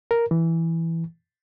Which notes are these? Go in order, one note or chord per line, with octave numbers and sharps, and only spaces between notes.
A#4
E3